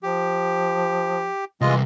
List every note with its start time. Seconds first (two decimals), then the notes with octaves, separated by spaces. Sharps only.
0.03 F3 G4
1.61 C2 E3 G#3 F4 D#5